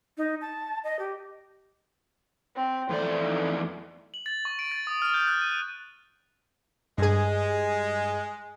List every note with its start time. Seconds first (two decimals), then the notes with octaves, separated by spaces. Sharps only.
0.17 D#4
0.41 A5
0.84 D#5
0.99 G4
2.55 C4
2.90 F2 E3 A3 C5 D5
3.23 D#4
4.14 F#7
4.26 A6
4.45 C#6
4.59 D7
4.72 A6
4.87 D#6
5.02 F6
5.14 G6
5.27 F#6
5.42 D#7
6.98 G2 G#3 G#4